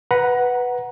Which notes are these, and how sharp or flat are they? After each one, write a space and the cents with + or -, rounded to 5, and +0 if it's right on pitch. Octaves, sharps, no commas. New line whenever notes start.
B4 +0 F#5 +0 A#5 +25